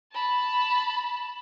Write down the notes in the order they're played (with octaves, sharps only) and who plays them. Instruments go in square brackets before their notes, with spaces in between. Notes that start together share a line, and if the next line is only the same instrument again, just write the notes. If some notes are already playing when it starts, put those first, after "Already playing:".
[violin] A5 B5